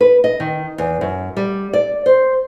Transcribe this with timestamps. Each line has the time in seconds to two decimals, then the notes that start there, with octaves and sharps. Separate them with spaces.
0.01 B4
0.24 D#5
0.40 D#3
0.78 E2
1.01 F#2
1.37 G3
1.73 D5
2.06 C5